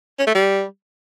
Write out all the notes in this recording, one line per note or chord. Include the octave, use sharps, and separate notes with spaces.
C#4
A3
G3